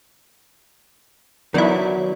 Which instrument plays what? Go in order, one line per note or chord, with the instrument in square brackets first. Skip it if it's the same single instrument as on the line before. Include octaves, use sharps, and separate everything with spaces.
[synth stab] D#3 E3 E4 [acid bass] F#3 [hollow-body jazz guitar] B3 D4